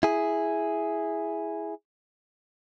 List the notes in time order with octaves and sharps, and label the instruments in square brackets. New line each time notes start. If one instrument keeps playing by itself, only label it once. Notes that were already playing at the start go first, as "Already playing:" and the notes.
[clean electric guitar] E4 G#4